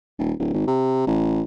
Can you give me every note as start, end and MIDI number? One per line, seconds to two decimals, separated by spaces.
0.19 0.33 27
0.39 0.50 26
0.54 0.64 32
0.67 1.06 48
1.07 1.42 33